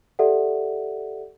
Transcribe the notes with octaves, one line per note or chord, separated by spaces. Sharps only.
G4 A4 D5 E5 F#5